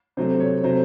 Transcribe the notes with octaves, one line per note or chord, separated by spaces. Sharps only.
C3 F#3 A3 C5
C#5
C3 F#3 A3 C5